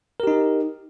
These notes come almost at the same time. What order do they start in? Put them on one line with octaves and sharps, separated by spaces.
A#4 G4 D#4